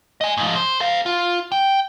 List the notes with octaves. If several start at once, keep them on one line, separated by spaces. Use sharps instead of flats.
D#5 G#5
G#2 F3
C5
A4 F5
F4
G5